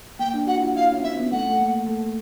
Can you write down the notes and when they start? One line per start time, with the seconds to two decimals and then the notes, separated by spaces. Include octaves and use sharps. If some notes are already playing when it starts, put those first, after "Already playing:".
0.19 A#3 G5
0.34 D4
0.47 F#4 F#5
0.56 E4
0.61 F4
0.75 E4 F5
0.92 C#4
1.03 C4 E5
1.17 B3
1.31 A3 F#5
1.50 A3
1.59 A#3
1.86 A3